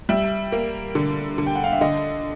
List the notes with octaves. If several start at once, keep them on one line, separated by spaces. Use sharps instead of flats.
G3 E5
A#3
D3
D3
G5
F#5
F5
E5
D3 D#5